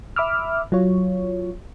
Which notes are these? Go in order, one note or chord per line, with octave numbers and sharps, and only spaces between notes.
E5 B5 D6 E6 F6
F#3 F4 C#5